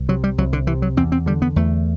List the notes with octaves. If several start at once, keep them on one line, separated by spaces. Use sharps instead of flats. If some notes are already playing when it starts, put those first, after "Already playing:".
Already playing: C2
C3 F#3
G3
C2 F#3
D3
C3 E3
F#3
E2 C4
C4
D3 G3
B3
E2 A3